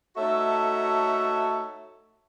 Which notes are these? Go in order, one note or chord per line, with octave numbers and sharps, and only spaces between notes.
A3 D#4 F#4 A4 C#5 E5